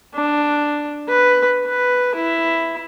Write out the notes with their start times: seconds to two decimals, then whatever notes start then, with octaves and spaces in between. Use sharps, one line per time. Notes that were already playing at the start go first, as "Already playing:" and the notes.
0.15 D4
1.08 B4
1.66 B4
2.15 E4